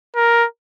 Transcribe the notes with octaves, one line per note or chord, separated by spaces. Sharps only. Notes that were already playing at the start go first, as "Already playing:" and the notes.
A#4